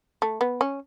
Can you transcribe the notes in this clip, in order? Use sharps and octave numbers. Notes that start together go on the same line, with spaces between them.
A3
B3
C#4